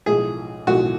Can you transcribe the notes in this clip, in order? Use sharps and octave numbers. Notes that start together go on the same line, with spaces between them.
B1 A2 F3 G#3 G#4
B1 A2 F3 G#3 F#4